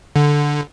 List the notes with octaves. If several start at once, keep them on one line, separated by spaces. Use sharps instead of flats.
D3